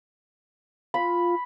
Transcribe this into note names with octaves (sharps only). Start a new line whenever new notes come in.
F4 B5